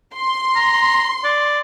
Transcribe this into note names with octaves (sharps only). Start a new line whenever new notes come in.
C6
A#5
D5